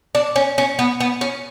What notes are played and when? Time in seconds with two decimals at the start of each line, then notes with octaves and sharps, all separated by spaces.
0.15 D4
0.36 C#4
0.58 C#4
0.79 B3
1.00 B3
1.21 C#4